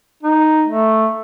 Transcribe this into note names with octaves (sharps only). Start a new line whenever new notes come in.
D#4
A3